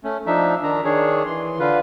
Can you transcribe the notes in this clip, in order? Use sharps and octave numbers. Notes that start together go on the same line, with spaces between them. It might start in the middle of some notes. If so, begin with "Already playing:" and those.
A3 C#4
F3 D4 D#4 E5
D#3 D4 A#5
D#3 D4 G#4 C#5
E3 C6
D3 F4 B4